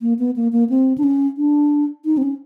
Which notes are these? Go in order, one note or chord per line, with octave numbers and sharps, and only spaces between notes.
A#3
B3
A#3
A#3
C4
D4
C#4
D4
D#4
C4
C#4